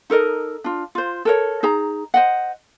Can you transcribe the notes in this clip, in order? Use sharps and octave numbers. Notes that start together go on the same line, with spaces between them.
D#4 A4 A#4 D#5
D4 F4
F4 C5
A4 A#4 C#5
D#4 G#4 A#5
C5 D#5 F#5